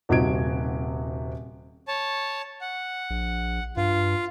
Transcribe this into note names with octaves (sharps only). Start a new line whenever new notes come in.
D#1 C3 F#4 D#5 G#6 D7
C#5 A5
F#5
A#1
G2 F4